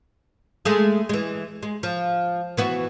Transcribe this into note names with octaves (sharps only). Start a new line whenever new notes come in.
G#3 A3 G#4
E3 G#3
G#3
F3
E3 B3 F#4